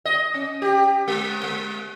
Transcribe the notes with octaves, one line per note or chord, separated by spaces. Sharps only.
D#5
C#4
G4
G#3
G#3